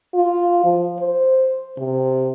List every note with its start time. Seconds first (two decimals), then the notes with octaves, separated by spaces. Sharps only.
0.14 F4
0.64 F3
0.99 C5
1.78 C3